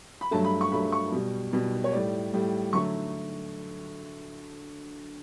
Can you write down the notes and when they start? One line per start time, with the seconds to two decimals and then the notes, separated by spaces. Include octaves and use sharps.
0.21 B5
0.31 G2 F#3 A3 A5
0.45 B5
0.61 C#6
0.72 G2 F#3 A3 B5
0.92 C#6
1.12 B2 G3
1.53 B2 G3
1.84 C#5
1.92 A2 G3 D5
2.33 A2 G3
2.73 D3 F#3 A3 C#6